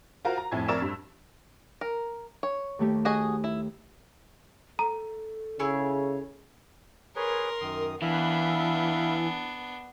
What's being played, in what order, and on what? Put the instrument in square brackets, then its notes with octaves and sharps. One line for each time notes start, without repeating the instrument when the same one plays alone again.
[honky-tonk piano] F4 F#4 A#4 C5 F5 F#5
A#5
F2 A2 E5 G#5 A5 G#6
F2 A#4 D5 C#6 E6 E7
G2
[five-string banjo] A#4
C#5
[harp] D#2 A3 G4
[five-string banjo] F#4 G#4 D#5
E4
[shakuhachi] A4 [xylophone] A#5
[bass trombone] C#3 [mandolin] E4 G#4 C#5
[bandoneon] G#4 B4 C#5 [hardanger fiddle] A#4 C6
[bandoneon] F#2 D#3 D#6
[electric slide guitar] E3 [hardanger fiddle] B3 D4 [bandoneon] E5 F5 B5